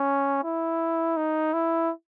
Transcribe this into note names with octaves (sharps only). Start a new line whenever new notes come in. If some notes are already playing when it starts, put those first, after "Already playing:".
Already playing: C#4
E4
D#4
E4